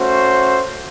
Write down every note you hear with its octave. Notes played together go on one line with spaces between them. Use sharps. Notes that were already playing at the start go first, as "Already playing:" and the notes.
Already playing: A3 C#4 F#4 C5